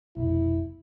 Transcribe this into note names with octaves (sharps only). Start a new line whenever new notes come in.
F1 B1 E4